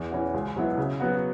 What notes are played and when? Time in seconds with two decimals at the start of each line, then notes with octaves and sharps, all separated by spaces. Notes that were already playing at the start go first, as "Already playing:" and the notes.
Already playing: E2
0.11 E3 C#4 F#4
0.34 C#2
0.55 B2 F#3 B3 E4
0.78 C#3
1.00 F#3 B3 F#4